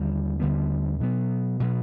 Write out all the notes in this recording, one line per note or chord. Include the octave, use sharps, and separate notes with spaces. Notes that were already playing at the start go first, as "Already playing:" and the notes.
Already playing: D#2 D3 G3 B3
D#2 D3 G3 B3
B2 F#3 B3
B2 F#3 B3